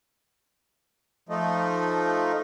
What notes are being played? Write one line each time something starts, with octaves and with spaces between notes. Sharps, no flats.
F3 A3 D#4